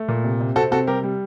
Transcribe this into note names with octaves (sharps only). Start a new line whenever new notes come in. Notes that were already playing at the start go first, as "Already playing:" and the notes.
Already playing: A3
A#2
C3
C3
C4 F#4 A4
C3 F#4 A4
G3 G4 A#4
G3